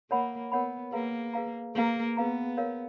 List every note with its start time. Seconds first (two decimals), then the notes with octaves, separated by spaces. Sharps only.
0.11 A#3 A#4 C#5 F#5 B5
0.52 B3 A#4 C#5 F#5 B5
0.92 A#3 G#4 B4 F5 A#5
1.33 G#4 B4 F5 A#5
1.75 A#3 G#4 B4 F5 A#5
2.17 B3 G#4 B4 F5 A#5
2.57 A#4 C#5 F5